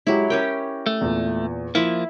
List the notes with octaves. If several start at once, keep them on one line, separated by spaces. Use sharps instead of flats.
F#3 G#3 E4 G4
C#4 G4 A#4 G5
A3
E2 A#2
F3 A#3 E4